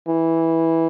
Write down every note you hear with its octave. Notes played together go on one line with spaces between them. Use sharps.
E3